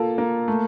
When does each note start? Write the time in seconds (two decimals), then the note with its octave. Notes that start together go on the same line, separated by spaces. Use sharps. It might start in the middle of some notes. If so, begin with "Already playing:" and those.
Already playing: A#3 F4 A4
0.18 A#3
0.48 A3